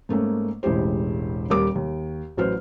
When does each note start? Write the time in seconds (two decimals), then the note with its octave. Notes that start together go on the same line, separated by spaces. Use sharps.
0.09 G#2 A3 A#3 C#4
0.63 E1 A1 G#3 E4 G4 C5
1.50 D#1 D#2 G3 A#4 D6
1.75 D#2
2.37 A1 F#3 B4 C5 F6